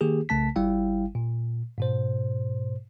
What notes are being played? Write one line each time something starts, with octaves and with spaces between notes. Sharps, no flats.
D#3 A#3 G4 G#4
C2 C#3 A3 A5 B6
G1 G3 E4 F5 G5
A#2
G#2 B2 C5